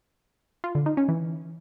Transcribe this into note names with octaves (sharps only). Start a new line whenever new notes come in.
F4
D3
D#4
C#4
E3